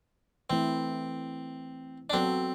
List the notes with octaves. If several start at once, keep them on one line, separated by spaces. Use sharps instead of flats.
E3 A3 C4 E4
D4
F#3 B3 C4 F#4 A4